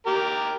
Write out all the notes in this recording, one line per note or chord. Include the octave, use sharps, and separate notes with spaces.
G4 A#4